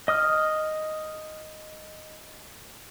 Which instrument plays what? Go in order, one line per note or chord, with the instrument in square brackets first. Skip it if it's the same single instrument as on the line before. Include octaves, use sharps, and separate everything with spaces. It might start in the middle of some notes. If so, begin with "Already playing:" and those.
[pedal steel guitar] D#5 D#6 F6